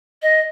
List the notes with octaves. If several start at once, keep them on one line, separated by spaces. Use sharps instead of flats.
D#5